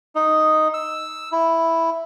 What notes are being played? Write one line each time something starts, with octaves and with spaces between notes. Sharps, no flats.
D#4
E6
E4